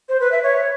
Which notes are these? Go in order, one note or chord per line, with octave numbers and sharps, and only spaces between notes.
C5
B4
E5
C#5